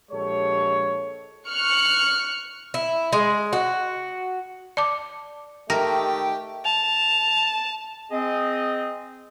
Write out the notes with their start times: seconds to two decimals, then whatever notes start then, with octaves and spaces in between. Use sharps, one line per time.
0.11 A#1 G#3 G4 A4 C#5
1.48 C#6 F6 F#6 C#7
2.74 E4
3.13 G#3
3.53 F#4
4.77 D5 A5 D6
5.70 D#3 A3 G4 A#4
6.65 A5 F7
8.11 C4 G#4 D#5